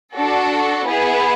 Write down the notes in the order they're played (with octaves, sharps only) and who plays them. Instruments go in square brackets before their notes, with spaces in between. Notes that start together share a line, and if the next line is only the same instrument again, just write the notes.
[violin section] D4 F#4 A4
B3 E4 G#4